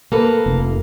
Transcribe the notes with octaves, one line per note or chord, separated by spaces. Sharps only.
A#3 A4 B4
F1